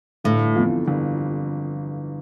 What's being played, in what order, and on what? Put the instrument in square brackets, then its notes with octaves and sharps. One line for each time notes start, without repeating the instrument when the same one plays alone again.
[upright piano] G1 [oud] A2
[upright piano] F2 E3 B3 F4
G1